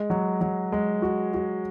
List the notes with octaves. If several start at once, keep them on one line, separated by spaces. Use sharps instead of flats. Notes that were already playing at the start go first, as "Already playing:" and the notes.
Already playing: G#3
F#3
F#3
G#3
F#4
F#4